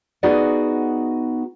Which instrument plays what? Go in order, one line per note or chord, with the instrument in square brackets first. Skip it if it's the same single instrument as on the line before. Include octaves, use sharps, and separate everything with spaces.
[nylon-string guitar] B3 D#4 F#4 G#4 D5 F#5